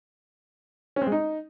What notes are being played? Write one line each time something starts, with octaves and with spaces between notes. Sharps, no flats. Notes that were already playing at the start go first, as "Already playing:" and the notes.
C#4
C4
G#3
D#4